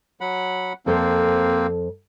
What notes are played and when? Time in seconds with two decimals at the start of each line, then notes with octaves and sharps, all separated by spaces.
0.21 F#3 F#5 B5
0.86 F2 A#3 C4 A4 C5